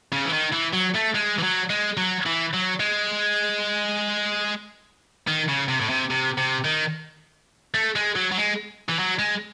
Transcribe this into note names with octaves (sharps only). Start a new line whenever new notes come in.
C#3
E3
D#3
E3
F#3
A3
G#3
E3
F#3
G#3
F#3
E3
F#3
G#3
D#3
C#3
C3
A2
C3
C3
C3
D#3
A3
G#3
F#3
F#3
G#3
E3
F#3
G#3